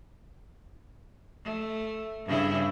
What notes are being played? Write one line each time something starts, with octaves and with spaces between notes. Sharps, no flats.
A3
G2 C#3 E4